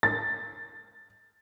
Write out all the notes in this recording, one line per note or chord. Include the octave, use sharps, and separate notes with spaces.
A6